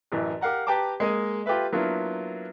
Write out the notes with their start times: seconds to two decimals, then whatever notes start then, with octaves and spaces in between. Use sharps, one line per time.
0.12 A1 F#2 E3
0.41 G4 A#4 F5 F#5 A#5
0.67 G4 B4 G5 A5 A#5 D6
1.00 G#3 A#3 G#4 D#5
1.46 F4 G4 A4 B4 E5
1.73 F#3 A#3 B3 D4 E4 F4